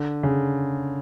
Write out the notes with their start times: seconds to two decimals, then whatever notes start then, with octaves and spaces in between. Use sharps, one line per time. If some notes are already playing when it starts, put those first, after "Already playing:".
Already playing: D3
0.23 C#3